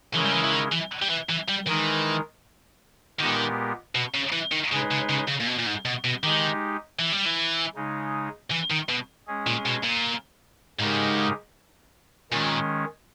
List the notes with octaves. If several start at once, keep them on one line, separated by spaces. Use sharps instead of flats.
C#3 E3 G#3 C#4 E4 A#4
G3
E3
E3
D#3
E3
G3
E3
E3
G3
D#3 E3 G#3 D#4 A#4
A#2 D#3 G#3 B3 G4 A#4
B2
C#3
E3
D#3
C#3 G#3 D#4 G#4 B4
C#3
C#3
C#3
A#2
B2
A#2
G#2
B2
B2
D#3 G#3 D#4 G4
E3
G3
E3
C#3 G#3 D#4
E3
D#3
B2
G#3 C#4 G#4
A#2
B2
A#2
G#2 C#3 G#3 D#4 G4 A#4
A#2 D#3 G#3 C#4